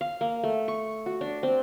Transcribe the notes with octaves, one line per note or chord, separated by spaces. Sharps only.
F5
A#3
A3
C#6
F#4
D4
C4